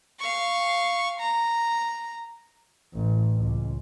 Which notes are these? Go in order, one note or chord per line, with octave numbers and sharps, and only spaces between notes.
F5 C#6
A#5
A1
C#2